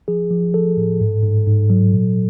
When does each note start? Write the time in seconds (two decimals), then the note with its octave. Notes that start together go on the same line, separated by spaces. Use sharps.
0.08 F3 G#4
0.31 F3
0.54 F3 A4
0.77 A2
1.01 G#2
1.23 G#2
1.47 G#2
1.70 F#3
1.93 A#2